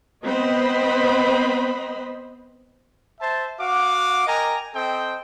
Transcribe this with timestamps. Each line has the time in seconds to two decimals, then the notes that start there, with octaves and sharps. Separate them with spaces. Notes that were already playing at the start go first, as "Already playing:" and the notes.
0.25 B3 C4 C5 D#5 B5
3.21 C5 E5 A5
3.59 F#4 F5 F#5 D6
4.27 A#4 D#5 G5 G#5 A#5
4.74 C4 A4 D#5 G5